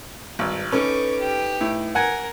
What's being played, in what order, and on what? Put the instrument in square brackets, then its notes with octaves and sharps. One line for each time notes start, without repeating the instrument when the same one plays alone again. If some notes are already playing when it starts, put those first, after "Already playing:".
[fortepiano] G#1 [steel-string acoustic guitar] G2
[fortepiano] C#4 [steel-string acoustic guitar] D#4 A4 B4 [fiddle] C#6 D6
[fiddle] G4
[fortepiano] A2
[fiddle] A#4 [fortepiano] F#5 G#5